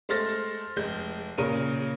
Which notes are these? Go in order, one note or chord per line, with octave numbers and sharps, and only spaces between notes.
G#3 A3 C5 F6 A6 A#6
F1 G#3 G6
A#2 C#3 A#4 D#7